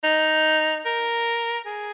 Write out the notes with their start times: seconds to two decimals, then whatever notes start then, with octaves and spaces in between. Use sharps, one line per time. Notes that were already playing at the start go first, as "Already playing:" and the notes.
0.04 D#4
0.86 A#4
1.66 G#4